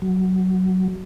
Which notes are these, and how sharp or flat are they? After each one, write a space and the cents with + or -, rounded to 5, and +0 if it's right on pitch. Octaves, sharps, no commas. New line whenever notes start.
F#3 +10